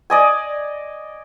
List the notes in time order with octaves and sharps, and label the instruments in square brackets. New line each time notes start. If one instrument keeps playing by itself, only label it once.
[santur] D5 D#5 G#5